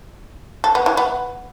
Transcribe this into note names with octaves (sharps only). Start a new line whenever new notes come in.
A4
B3
E3
B3